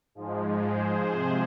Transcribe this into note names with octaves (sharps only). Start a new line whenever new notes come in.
G#2 F3 G#3
G#4 C5
C3 F3 G#3